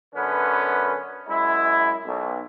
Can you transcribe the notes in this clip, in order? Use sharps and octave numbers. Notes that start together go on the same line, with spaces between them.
F#2 D3 B3 C#4 B4
F#2 G#3 E4
B1